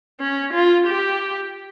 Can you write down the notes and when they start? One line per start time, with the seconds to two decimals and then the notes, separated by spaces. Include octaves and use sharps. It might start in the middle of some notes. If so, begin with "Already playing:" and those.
0.20 C#4
0.53 F4
0.87 G4